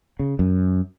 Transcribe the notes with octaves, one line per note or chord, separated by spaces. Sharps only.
C#3
F#2